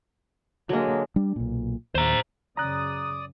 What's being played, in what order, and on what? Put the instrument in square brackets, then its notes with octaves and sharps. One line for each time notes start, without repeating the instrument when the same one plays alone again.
[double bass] D3 A#3 [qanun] F#3 G#3
[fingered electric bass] G3 D4
B1 A#2
[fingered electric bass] D#2 [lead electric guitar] C5 A#5
[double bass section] F#2 C#3 [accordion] D5 D#6 [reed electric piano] A#5 F#6